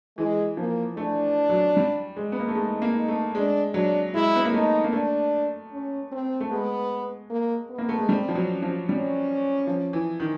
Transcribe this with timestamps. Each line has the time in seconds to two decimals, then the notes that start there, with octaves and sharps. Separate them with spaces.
0.18 E3 G#3
0.57 F3 A#3
0.97 A3 D4
1.49 F#3
1.77 G3
2.17 G#3
2.32 B3
2.40 A#3
2.48 A3
2.55 G#3 D#4
2.82 A#3
2.95 D#4
3.08 A3
3.35 G#3 D4
3.74 F#3 D4
4.14 G#3 E4
4.36 B3
4.45 A#3
4.53 A3 D#4
4.84 A#3
4.93 A3 D4
5.72 C#4
6.12 C4
6.41 A3
6.51 G#3 B3
7.30 A#3
7.69 B3
7.78 A#3
7.89 A3
7.99 G#3
8.09 G3 C4
8.29 F3
8.35 F#3
8.49 C#4
8.63 F3
8.89 G3 C#4
9.67 F3
9.93 E3
10.20 D#3